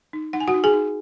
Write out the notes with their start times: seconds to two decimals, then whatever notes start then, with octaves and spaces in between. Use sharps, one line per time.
0.13 D#4
0.33 D#4 F#5
0.40 G#5
0.48 F#4 F#5
0.54 D#4
0.64 G#4 G#5
0.73 D#4